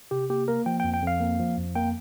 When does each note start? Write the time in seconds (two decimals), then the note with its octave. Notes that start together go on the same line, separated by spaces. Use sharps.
0.11 C3 G4
0.30 A#3 G4
0.48 A#3 A#4
0.66 F3 G5
0.80 F2 G5
0.94 G5
1.02 F2 F5
1.20 A#3
1.40 F3
1.58 F2
1.75 A#3 G5